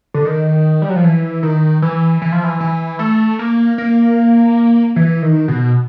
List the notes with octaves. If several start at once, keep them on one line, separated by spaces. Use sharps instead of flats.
D3
D#3
G3
F#3
F3
E3
D#3
E3
E3
F3
E3
E3
A3
A#3
A#3
E3
D#3
B2